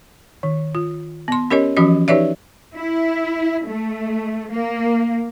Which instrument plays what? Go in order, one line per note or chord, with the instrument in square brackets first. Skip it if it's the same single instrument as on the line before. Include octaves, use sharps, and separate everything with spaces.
[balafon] D#3
F4
B3 C6
C#4 G4 A#4 C#5 D#5
E3 F3 C#4 F#4 D#5
D#4 G4 B4 C#5 D5 E5
[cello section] E4
A3
A#3